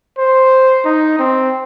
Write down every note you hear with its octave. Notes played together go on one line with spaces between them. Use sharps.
C5
D#4
C4